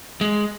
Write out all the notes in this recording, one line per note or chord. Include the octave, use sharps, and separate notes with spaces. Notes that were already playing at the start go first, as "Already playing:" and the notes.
G#3